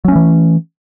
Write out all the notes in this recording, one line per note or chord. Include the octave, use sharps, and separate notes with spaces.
E3 F#3 A3 C#4